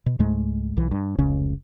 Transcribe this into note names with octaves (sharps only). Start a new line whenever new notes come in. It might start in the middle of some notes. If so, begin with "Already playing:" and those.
B2
C#2 G#2 G#3 A3
B1 E3
G2
F1 C#2 C#3 C#4